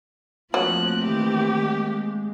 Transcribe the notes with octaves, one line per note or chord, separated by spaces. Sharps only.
F3 F#3 A3 A#3 C4 F#6
D#3 E3 G4
G#3